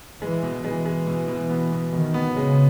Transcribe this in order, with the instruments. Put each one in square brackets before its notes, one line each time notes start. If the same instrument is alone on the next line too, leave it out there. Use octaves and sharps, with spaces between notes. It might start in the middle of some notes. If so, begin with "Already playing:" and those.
[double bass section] E3 [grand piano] G#3
[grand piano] B2
[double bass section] E3 [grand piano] G#3
[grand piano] G#3
B2
B2
B3
B2
[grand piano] B2 [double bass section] D#3
[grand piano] B3
[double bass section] C#3 [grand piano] G#3